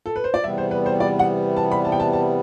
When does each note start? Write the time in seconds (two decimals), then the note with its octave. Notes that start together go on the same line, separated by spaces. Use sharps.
0.06 A4
0.16 B4
0.24 C5
0.34 D5
0.43 E2 C3 G3 B3 E5
0.58 C5
0.71 B4
0.86 C5
1.00 D5
1.19 F#5
1.56 A5
1.71 B5
1.85 A5
1.92 G5
2.00 A5
2.13 A5